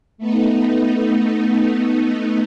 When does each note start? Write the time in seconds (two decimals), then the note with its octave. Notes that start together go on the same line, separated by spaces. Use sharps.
0.18 A3 B3 D#4